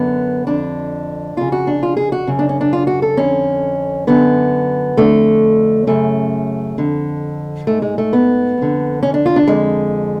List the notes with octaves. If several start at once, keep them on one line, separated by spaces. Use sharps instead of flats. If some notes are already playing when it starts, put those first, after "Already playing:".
Already playing: F#2 D3 B3
F2 D3 D4
F2 C#3 F4
F#4
D4
F4
G#4
F#4
F#2 C#3
D4
C#4
D4
F4
F#4
A4
F2 D3 C#4
F#2 D3 B3
F2 D3 A3
F#2 C#3 A3
F2 D3
G#2 A3
G#3
A3
B3
F2 D3
C#4
D4
F4
D4
F2 D3 G#3